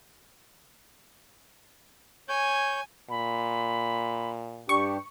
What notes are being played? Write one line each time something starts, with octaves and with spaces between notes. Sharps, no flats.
C#5 G#5 G6
A#2 B5
G2 D4 G4 C#6